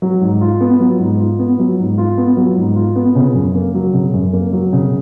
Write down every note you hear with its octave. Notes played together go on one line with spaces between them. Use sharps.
F#3
G#2
F4
B3
F#3
G#2
F4
B3
F#3
G#2
F4
B3
F#3
G#2
F4
B3
C#3
F#2
A#3
F#3
C#3
F#2
A#3
F#3
C#3